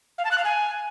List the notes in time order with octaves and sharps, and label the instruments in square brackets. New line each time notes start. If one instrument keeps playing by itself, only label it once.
[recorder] F5
A5
F#6
F5
G#5